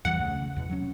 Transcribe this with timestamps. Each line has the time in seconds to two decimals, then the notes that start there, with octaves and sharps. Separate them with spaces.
0.05 E2 E3 G3 F#5
0.19 C#2 C#3 A3
0.56 E2 B2
0.69 F#3 C#4